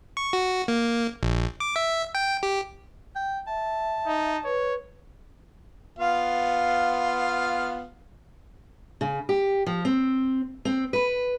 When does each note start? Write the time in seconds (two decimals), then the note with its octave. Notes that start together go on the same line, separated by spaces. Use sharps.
0.17 C#6
0.33 F#4
0.68 A#3
1.23 A#1
1.60 D6
1.76 E5
2.15 G5
2.43 G4
3.16 G5
3.47 E5 A5
4.07 D#4
4.45 B4 C#5
5.98 B3 F4 F5
9.01 C#3
9.29 G4
9.66 F3
9.85 C4
10.65 C4
10.93 B4